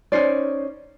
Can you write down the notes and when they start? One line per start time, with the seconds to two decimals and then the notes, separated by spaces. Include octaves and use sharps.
0.12 C#4 D#4 C5 D5